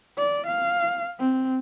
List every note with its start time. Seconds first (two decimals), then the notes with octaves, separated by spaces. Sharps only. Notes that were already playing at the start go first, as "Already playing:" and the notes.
0.18 D5
0.47 F5
1.19 C4